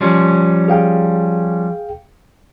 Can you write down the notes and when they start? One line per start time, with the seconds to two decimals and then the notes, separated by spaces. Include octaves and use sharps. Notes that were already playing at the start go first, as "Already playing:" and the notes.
0.01 F3 G3 C#4
0.68 G#4 F5 G5